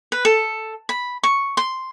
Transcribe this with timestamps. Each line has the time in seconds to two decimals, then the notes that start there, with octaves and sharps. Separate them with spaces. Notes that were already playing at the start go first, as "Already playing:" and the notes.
0.12 B4
0.25 A4
0.89 B5
1.23 C#6
1.57 C6